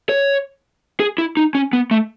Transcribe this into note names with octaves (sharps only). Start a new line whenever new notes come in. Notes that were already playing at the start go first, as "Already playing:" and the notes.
C#5
G#4
E4
D#4
C#4
B3
A3